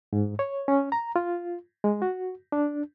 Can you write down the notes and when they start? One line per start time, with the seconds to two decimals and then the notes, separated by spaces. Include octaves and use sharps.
0.13 G#2
0.39 C#5
0.68 C#4
0.92 A#5
1.16 F4
1.84 G#3
2.02 F#4
2.52 D4